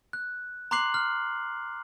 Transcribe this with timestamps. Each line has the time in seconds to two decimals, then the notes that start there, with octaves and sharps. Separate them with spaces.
0.13 F#6
0.71 A#5 C6 D6 F#6 C7 F#7
0.94 F6